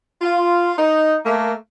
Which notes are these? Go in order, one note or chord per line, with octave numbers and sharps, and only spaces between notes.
F4
D#4
A3 A#3